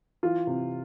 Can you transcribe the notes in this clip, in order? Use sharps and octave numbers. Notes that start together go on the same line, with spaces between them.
E3 F4
C3